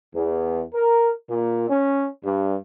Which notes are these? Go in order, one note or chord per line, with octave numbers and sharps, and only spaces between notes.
E2
A#4
A#2
C#4
G2